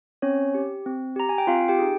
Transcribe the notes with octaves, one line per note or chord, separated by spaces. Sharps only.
C4 C#4 C#5
G4
C4
G4 A#5
G#5
G5
C4 F4 F5
G4 G5
D#4 G#4